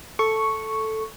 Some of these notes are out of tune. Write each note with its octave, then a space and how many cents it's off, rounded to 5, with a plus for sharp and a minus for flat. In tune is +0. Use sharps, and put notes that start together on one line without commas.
A4 +0 C#6 +0